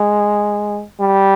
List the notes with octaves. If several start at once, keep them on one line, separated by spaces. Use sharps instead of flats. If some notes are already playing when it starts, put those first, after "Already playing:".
Already playing: G#3
G3